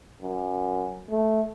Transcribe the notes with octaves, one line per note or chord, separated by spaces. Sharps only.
F#2
A3